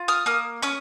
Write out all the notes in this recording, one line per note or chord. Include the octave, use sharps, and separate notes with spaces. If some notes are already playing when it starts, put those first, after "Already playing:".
Already playing: F4
D#6 F6
A#3 D#6 F6
C#4 C#6 D#6